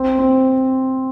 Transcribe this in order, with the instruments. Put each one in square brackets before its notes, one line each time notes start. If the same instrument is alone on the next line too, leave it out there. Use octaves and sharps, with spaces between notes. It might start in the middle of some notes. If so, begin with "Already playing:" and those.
Already playing: [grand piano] C4
C4